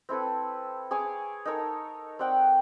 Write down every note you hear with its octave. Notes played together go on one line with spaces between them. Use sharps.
C4 E4 A4 B4
G#4 C#5 G#5 D6
D#4 A4 A#4 C#5
C4 D5 F#5 G5